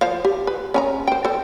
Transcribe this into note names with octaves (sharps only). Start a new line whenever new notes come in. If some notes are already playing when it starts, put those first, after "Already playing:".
F3 C5 F5
G4
B4
C#4 G#5 A#5
C5 G5
A4 C5